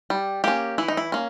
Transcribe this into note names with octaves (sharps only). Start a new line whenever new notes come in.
G3
A#3 C#4 G4
E3 E4
D#4
E4
A#3 C#4